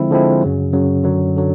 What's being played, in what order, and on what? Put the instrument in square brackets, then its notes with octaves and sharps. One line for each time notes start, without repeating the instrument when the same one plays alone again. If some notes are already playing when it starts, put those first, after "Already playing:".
Already playing: [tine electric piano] D3 F3 G#3 C4 E4
D3 F3 G#3 C4 E4
F#2 C#3 F#3
F#2 C#3 F#3
F#2 D3 F#3
D3 F#3